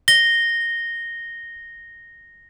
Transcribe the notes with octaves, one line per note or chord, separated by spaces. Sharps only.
A#6 G7